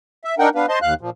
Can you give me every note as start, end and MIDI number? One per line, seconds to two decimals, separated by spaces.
0.25 0.35 76
0.39 0.49 62
0.39 0.49 63
0.39 0.49 70
0.39 0.49 78
0.39 0.49 79
0.55 0.66 59
0.55 0.66 62
0.55 0.66 71
0.55 0.66 77
0.69 0.79 72
0.69 0.79 75
0.69 0.79 81
0.69 0.79 84
0.82 0.94 39
0.82 0.94 77
0.82 0.94 90
1.01 1.10 46
1.01 1.10 53